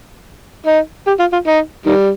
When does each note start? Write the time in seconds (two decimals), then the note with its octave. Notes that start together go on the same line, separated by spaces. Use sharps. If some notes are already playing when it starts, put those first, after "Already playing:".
0.66 D#4
1.07 G4
1.19 F4
1.33 F4
1.47 D#4
1.86 D#3 G3